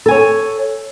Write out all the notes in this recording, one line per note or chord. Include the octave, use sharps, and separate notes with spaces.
A4 C#5 G#5